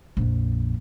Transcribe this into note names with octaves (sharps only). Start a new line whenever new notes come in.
A#1 F2